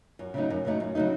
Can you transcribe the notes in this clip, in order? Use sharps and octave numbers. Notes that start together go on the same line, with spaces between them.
F#2
C#3 F#3 A3 D#4
F#2
C#3 F#3 A3 D#4
F#2
C#3 F#3 A3 D#4